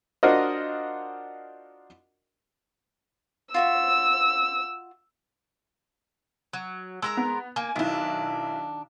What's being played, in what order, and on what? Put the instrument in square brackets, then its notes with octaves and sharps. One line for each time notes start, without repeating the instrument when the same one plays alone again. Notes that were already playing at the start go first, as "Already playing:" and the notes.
[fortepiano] D4 F4 F#4 A#4 C5 D#5
[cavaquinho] F4 F#4 E5 [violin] E6
[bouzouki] F#3
[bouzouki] G#3 A#4 A#5 [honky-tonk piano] E6
[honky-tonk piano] B3
[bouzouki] A#3 [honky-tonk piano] G#5
[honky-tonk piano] B1 E4 [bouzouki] D#3 D4